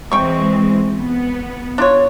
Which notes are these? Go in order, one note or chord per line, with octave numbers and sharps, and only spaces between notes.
E3 G#3 C4 G5 C#6
B3
D4 F4 C#5